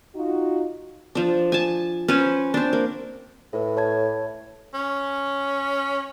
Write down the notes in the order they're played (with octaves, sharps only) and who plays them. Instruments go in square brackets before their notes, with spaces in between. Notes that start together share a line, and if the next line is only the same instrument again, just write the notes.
[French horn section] D#4 F4 F#4
[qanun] F3 D4
G#5 A5
C#4 B4 C5
C4 D4
A#3
[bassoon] A2 [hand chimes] A4 B4
[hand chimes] C#5 A5 G#6
[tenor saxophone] C#4